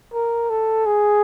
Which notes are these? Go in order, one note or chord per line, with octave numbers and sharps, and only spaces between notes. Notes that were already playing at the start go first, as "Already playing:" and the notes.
A#4
A4
G#4